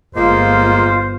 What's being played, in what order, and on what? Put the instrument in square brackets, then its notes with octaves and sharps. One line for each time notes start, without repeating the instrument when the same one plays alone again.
[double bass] G1 [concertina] G#3 A#3 [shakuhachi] F4 [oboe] C5